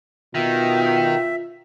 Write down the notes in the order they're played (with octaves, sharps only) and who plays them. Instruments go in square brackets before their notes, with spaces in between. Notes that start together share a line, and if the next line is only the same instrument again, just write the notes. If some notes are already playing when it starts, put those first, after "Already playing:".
[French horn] B2 [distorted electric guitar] D#3 [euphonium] F4 [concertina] E5